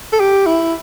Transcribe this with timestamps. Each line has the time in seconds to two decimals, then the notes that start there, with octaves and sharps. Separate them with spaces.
0.13 A4
0.20 G4
0.46 E4